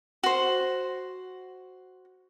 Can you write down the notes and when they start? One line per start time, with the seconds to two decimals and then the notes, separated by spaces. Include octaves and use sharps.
0.23 F#4 C5